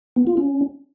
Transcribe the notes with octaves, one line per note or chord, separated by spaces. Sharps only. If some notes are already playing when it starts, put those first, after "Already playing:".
B3
F4
C#4